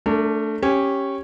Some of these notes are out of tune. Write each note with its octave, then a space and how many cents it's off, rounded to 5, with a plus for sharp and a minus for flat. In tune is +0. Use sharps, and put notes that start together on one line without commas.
A3 +0 D4 -15 A#4 -35
C#4 -10 G4 +0